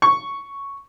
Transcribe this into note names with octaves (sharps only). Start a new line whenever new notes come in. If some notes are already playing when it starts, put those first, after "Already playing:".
C#6